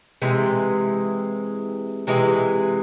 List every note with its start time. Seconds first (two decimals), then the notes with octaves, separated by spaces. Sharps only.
0.22 C3 E3 G#3
2.07 C3 E3 G#3